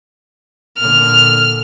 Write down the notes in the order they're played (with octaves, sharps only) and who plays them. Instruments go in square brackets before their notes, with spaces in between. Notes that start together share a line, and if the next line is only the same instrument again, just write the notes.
[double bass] A#2 D3 [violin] F6